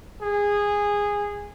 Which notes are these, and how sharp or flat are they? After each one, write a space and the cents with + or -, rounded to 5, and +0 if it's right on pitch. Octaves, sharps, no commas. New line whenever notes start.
G#4 -15